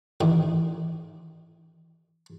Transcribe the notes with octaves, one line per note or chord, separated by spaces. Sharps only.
A1 D#3